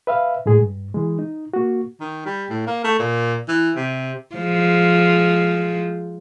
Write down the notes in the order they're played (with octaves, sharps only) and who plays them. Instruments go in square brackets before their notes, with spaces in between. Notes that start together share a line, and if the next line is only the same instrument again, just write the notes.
[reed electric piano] B4 E5 F5
A2 G#3 G#4
G2
E3 G#3
D#4
A#3 F#4
[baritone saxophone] D#3
G3
A2
A#3
A3
A#2
E3
C3
[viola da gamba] F3 G#3